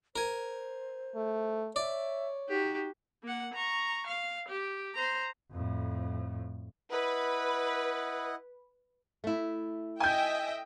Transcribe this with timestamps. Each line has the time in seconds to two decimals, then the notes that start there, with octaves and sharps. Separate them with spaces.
0.16 A#4 C5 G#5
1.16 A3
1.76 C#5 D5 E5
2.49 D#4 F#4 G4
3.23 A#3 F#5
3.54 A#5 C#6
4.07 F5
4.49 G4
4.95 C5 A#5
5.51 F2 A2
6.92 E4 B4 D#5 F#5
9.24 A3 E4
10.00 D#5 E5 G5 G#5 G6